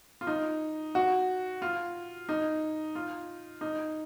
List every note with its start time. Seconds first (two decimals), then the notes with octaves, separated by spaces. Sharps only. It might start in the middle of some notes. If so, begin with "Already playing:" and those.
0.21 F4
0.27 D#4
0.95 F#4
1.62 F4
2.29 D#4
2.95 F4
3.61 D#4